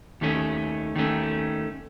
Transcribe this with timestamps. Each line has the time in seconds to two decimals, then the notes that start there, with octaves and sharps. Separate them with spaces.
0.21 D#2 D#3 A3 C#4
0.95 D#2 D#3 A3 C#4